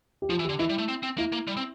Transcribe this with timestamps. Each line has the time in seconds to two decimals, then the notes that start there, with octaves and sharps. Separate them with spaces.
0.22 G4
0.29 F3 F4
0.39 E3
0.44 D3 G4
0.59 E3 E4
0.69 G3
0.78 A3
0.88 C4
1.03 C4
1.18 A#3 E4
1.32 A#3
1.47 G3
1.57 C4